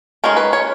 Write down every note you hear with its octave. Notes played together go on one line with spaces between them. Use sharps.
D#3 G#3 C#4 A#4
B4
C#5